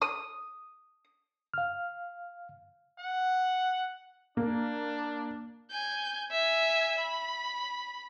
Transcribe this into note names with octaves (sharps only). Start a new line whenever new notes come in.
D#6
F5 F6
F#5
A#3 D4
G#5 G6
E5 G#5
B5